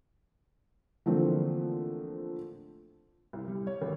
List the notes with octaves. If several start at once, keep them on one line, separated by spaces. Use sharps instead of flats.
D3 E3 F3 A3 A#3 C4
C2
G3
C#5
G#1